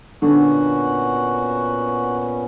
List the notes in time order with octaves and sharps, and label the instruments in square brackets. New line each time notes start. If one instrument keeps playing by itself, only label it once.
[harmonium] A#2 B3 C#4 [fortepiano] D3 [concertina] F#4